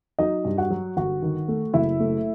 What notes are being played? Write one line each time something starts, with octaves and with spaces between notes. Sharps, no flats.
F#3 D#4 D#5
G2
F#4 F#5
F#3
G1 F#4 F#5
D#3
A3
F#1 E4 E5
A3